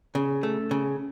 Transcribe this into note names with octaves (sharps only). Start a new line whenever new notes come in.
C#3
A3
C#3